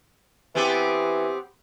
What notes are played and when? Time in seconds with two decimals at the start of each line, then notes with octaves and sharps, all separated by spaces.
0.55 E3 B3 C4 G4